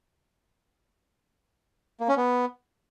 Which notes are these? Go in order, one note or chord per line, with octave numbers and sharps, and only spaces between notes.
A#3
C#4
B3